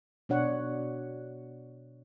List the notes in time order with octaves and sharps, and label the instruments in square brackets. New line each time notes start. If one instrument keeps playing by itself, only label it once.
[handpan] B2 D4 C#5 F#5